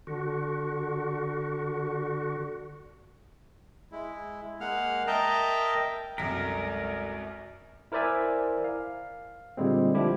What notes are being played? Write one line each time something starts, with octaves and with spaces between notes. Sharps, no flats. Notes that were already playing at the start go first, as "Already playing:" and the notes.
D3 F#4
G#3 E4
G#3 A#3 F5 F#5 F6
A#4 D#5 E5 G5 A5 A#5
C2 F#2 G#3 A4 A#4 D5 B6
E4 A#4 C5 D5 E5 G#5
F5
A#2 D3 G3 G#3 C4
D3 F3 E4 G4